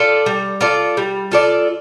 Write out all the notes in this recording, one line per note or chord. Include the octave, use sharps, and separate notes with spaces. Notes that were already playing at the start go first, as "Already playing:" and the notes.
Already playing: F4 A4 D5
G3
F4 A4 D5
G3
F4 A4 D5